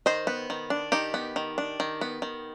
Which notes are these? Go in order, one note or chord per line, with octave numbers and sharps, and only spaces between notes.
D#3 C5 D#5
B3
D#3
D4
D#3 D#4 G4
B3
D#3
D4
D#3
B3
D#3